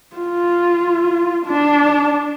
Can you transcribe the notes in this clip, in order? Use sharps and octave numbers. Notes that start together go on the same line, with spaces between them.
F4
D4